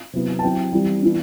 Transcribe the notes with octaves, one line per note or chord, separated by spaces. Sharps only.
C3 F#3 B3 E4
A5
F#3 C4 E4 G5
E3 G3 C4 E4
E3 B3 D4